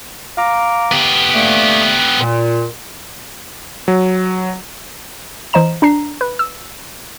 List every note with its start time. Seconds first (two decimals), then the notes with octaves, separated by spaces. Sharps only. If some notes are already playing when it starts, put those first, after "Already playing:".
0.38 F5 A#5 D6
0.92 B3 G4
1.34 D3 A3 A#3
2.20 A#2
3.88 F#3
5.53 E3 C5 D#5 A#5 E7
5.82 D4 A#5 C7
6.21 B4
6.39 E6